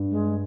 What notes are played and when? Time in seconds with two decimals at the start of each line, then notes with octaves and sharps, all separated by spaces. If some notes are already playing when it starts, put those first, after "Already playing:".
Already playing: G2
0.11 G#3